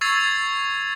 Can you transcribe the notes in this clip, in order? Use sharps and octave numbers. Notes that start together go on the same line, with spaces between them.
C#6 E6 G#6 A6 C7 F7